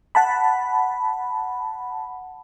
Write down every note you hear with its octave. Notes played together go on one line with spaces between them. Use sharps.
F#5 A5 B5